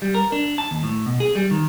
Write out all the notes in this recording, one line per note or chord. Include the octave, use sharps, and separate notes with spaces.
G3
A#4
D4
A5
D#2
A2
B2
G#4
G3
D#3